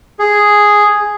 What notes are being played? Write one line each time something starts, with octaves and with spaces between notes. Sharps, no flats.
G#4